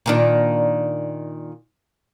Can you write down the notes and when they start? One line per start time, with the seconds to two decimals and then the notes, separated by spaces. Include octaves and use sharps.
0.06 A#2 D#3 D4